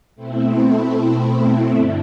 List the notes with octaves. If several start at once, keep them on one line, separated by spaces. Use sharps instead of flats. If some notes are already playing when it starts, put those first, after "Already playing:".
B2 A3 C4 E4
G2 D3